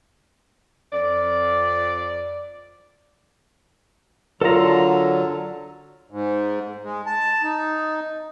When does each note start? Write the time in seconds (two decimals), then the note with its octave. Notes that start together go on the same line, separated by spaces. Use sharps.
0.92 F2 D5
4.41 D3 F#3 F4 A4 A#4 A#5
6.11 G#2
6.84 G#3
7.06 A5
7.43 D#4